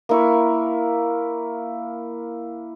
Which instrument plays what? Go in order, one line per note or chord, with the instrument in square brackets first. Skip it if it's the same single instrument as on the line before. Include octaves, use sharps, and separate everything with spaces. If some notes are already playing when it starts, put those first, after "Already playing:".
[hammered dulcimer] A#3 E4 C#6